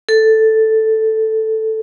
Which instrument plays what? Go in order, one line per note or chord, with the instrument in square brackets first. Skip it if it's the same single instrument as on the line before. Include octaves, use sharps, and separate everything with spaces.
[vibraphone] A4